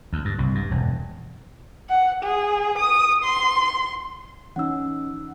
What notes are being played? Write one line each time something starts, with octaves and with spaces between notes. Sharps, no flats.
D2
G2
C2
G2
E1
F#5
G#4
D#6
C6
E3 C#4 D#4 F#5 E6